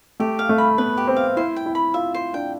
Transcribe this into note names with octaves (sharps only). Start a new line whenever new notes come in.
A3 G4
F5
A3
B5
B3 B4
G4
C4
F5
E4 C5
G5
E4
B5
F4 E5
C5
D4 G5